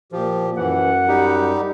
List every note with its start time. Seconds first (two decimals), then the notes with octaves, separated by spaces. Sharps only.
0.12 A#2 F3 G4
0.57 F#2 E3 F#5
1.08 G3 D#4 G4